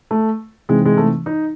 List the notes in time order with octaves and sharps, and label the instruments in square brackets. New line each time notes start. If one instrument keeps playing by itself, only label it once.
[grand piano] A3
[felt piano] C3 E3 C4 D#4 [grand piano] G#3
[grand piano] G#3
A3
D#4